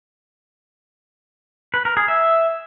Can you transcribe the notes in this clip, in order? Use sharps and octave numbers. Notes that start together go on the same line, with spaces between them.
B4
A#4
G#4
E5